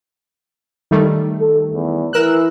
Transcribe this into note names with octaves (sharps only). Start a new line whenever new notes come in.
D#3 G3 A3
A4
E2
E3 A#4 E6 F#6